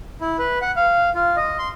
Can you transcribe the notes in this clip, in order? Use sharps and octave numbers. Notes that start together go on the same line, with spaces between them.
E4
B4
F#5
F5
F4
D#5
C6